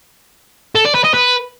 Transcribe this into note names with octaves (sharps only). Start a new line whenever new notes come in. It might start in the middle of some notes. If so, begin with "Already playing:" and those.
A4
D5
B4
D#5
B4